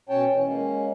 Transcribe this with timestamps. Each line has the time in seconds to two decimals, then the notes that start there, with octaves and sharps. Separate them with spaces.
0.09 B2 C#4 C#5 G5 A5
0.33 E3 C#4
0.46 G#3 A#3 C#4